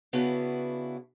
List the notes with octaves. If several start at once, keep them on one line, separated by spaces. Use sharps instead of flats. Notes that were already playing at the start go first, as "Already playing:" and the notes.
C#3 B3 D4 E4 F#4 B4